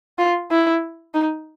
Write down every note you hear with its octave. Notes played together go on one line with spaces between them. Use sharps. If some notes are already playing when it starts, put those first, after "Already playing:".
F4
E4
D#4